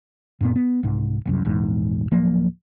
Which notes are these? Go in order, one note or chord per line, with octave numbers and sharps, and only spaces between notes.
F#2 A#2 B3
B3
C2 G#2
F#1 C2 F#2
A#1 E2 G#2
D1 F3 F#3 A#3